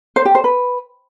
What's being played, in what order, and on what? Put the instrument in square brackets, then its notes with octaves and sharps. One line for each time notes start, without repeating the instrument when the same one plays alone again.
[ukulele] C5
G4
C5
B4